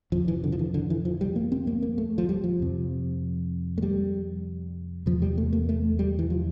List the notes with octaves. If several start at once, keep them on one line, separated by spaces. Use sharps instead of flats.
F2 C3 F3
E3
D3
F3
E3
D3
E3
F3
G3
A#3
C4
A#3
A#3
A3
F3
G3
F3
F2 C3
A3
G3
E2 C3 F3
G3
A3
A#3
A3
G3
E3
F3